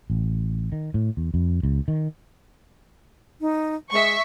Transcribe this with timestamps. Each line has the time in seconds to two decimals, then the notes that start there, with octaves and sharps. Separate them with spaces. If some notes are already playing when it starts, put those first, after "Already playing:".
0.10 A1
0.72 D#3
0.94 A2
1.17 E2
1.34 F2
1.63 C#2
1.88 D#3
3.41 D#4
3.92 G#3 E5 C#6